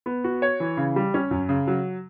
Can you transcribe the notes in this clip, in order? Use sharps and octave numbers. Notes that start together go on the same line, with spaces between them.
B3
F#4
C#5
E3
C#3
G3
C#4
F#2
C#3
F#3